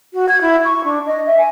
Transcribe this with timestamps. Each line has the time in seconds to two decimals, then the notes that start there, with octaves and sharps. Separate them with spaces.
0.13 F#4
0.29 G#6
0.41 E4
0.65 C#6
0.84 D4
1.07 D#5
1.27 E5
1.38 G#5